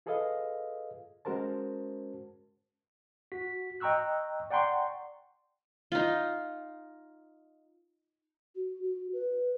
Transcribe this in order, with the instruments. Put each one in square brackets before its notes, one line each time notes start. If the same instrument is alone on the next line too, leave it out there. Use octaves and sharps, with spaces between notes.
[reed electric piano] F4 G#4 A4 B4 D#5 F5
G#3 C#4 F#4 A#4 C5 A5
[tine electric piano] F#4 B6
D#5 G5 A#5 C#6 E6 F#6
D5 F#5 G5 A#5 C6 C#6
[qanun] D#4 F4
[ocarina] F#4
F#4
B4